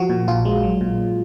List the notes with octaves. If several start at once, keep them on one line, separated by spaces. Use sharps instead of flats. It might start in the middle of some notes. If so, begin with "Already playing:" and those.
Already playing: F3 F#4
A#2
A#1 F4
G#3
F#3
A#2